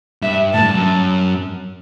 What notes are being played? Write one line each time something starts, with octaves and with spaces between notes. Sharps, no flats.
G2 E5
A2 A5
G2
F#2